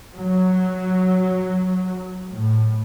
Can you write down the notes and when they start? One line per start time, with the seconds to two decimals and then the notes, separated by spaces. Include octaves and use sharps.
0.17 F#3
2.32 A2